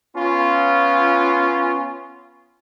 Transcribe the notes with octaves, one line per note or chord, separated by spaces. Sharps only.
B3 C#4 F4